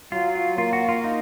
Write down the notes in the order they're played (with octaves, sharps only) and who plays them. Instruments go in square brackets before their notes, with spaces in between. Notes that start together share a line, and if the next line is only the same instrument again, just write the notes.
[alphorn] F#3 [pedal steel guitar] F4
[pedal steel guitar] F4
[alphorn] A#3 [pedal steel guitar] F4
[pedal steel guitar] F#4
F4
D#4